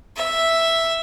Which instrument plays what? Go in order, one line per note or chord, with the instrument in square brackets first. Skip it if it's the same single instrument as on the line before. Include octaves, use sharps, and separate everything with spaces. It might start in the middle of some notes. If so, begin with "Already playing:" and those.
[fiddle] E5